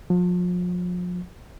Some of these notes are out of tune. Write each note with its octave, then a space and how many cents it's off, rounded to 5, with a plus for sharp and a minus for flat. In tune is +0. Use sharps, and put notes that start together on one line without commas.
F3 +35